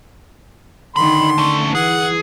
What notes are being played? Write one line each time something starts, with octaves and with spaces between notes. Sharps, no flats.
D3 D#3 B5 C6
D3 A3 C#4
E3 G#4 F#5